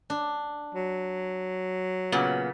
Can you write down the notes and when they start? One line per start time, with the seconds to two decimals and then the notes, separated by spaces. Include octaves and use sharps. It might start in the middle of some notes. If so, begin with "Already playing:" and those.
0.10 D4
0.75 F#3
2.12 A#2 C#3 B3